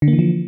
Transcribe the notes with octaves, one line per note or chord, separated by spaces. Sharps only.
D3
A#3
E3
F3